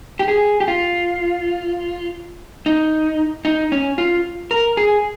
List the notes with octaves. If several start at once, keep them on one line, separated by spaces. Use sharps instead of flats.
G4
G#4
G4
F4
D#4
D#4
C#4
F4
A#4
G#4